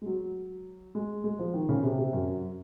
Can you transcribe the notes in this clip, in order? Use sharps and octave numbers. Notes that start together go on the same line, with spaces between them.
G#3
F#3
G#3
G#3
F3
D#3
C#3
C3
C3
F#2